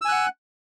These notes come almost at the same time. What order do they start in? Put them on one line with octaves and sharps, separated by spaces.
E6 G#5 F#6 F#5